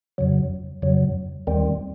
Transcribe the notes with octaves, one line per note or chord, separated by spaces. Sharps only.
F2 C#3 F#3
F2 C#3 F#3
D#2 D#3 G3 C4